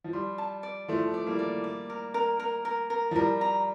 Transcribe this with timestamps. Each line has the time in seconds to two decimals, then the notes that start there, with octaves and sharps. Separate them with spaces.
0.04 F3
0.13 G3 C6
0.38 A5
0.63 D5
0.88 F3 A3 C6
1.14 D5
1.26 G3 A#3
1.39 D5
1.64 D5
1.90 A#4
2.14 A#4
2.40 A#4
2.65 A#4
2.90 A#4
3.11 F3
3.16 G3 A#4
3.41 A#5